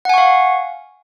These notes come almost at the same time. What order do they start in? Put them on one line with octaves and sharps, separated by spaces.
F#5 G#5 C#6 F5